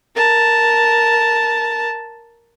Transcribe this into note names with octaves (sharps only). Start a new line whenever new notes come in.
A#4 A5